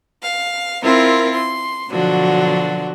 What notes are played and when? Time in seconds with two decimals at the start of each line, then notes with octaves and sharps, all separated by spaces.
0.22 F5
0.83 C4 E4 F4 A#4
1.35 C6
1.90 B2 D3 F3 F#3 D4 F#4